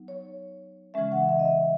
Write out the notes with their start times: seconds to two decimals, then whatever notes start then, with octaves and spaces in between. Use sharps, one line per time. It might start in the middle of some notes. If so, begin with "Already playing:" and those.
Already playing: F#3 B3 D#4
0.08 C#5
0.94 C#3 E3 G#3 C#4 E5
1.12 F#5
1.29 E5
1.39 D#5
1.45 E5